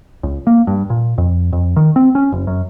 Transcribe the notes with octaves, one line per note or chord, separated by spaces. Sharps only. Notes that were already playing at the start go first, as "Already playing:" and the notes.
C#2
A#3
G2
A#2
F2
F2
D#3
C4
C#4
F#1
F#2